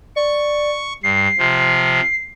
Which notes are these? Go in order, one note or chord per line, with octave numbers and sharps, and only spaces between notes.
D5 C#6
G2 C7
C3 F3